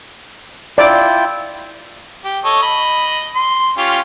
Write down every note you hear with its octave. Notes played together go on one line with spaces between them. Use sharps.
E4 F4 D5 G5
G4
A4 C#5 D#5
D#5 B5
C6
C#4 F4 G4